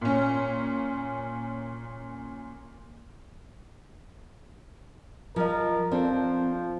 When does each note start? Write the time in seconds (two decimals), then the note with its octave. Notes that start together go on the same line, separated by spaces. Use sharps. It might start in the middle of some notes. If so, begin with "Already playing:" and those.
0.01 A#2 C#4
5.36 F3 A#4 D#5
5.91 F3 C4 D4 A4